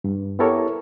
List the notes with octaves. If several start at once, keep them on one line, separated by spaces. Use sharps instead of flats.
G2
B3 E4 G4 A4 A#4 C#5